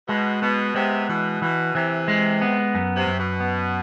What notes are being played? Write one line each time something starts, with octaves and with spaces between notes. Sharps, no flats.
B2 G#3
B2 B3
C3 G#3
B2 E3
B2 E3
C3 E3
G#3
B3
F#2
C3
F#2
B2
B3